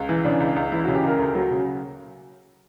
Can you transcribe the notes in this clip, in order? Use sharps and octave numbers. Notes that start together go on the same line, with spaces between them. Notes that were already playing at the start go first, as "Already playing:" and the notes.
Already playing: C#2
E3
C#3 D4
C#2
C#2
E3 E4
F#4
C#3
G4
C#2 A#4
D2
F#3
C#3